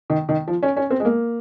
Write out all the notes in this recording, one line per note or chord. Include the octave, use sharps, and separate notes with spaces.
D#3
D#3
F3
C#4
C#4
C4
G#3
A#3